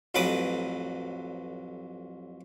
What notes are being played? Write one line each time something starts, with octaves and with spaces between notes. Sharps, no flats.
A1 F2 F#3 B4 D6 D#6